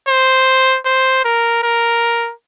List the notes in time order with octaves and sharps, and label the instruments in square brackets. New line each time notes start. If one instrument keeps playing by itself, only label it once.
[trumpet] C5
C5
A#4
A#4